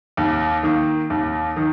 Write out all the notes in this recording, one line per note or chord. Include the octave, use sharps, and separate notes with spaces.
D#2
D#3 A#3
D#2
D#3